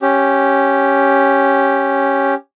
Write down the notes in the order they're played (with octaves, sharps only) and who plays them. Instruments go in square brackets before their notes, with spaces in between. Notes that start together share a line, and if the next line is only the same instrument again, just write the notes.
[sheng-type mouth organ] C#4 G4